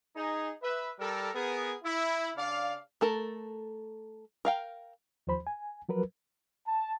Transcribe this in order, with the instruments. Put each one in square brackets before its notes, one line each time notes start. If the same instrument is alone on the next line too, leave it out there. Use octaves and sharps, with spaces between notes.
[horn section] D#4 G#4
B4 E5
G3 A4 A#4
B3 G#4 A#4
E4
C#3 D4 D5 F5
[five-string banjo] A3 A4 A#4
A#4 F5 G5
[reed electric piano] D#2 F3 C5 B5
G#5
F3 F#3 A#4 B4
[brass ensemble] A5